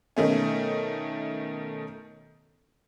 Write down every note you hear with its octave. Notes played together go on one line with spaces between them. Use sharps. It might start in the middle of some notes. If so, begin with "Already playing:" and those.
B2 D#3 A3 C#4